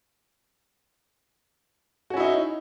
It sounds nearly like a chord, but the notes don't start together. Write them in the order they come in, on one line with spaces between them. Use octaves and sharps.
F#4 C#4 E4 D#4